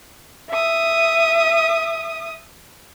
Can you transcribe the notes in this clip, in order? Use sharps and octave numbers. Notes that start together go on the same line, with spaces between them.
E5 D#6